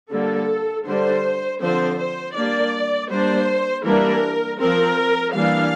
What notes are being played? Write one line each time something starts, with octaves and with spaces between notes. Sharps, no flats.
D3 G3 A#3 A4
D3 G3 D4 C5
D3 F3 C4 C5
C5
G3 A#3 D4 D5
G3 A#3 D4 C5
E3 G3 A#3 D4 A#4
F3 C4 A#4
E3 G3 A#3 D4 F5